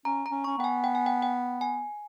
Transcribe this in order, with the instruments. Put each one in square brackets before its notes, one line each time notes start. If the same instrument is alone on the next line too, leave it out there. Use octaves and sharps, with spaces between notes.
[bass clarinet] C#4 [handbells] A#5
[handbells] A#5
[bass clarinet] C#4
[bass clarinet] C#4 [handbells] C#6
[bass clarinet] B3 [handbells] G5
[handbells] G#5
G5
G#5
G5
G5
G#5